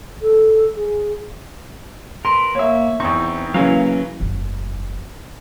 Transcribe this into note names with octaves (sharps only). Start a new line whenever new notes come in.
A4
G#4
A#4 B4 C6
A#3 C#5 E5
E2 C4 D#4 C#6
C#3 E3 F#3 A#3 F5
F#1 E2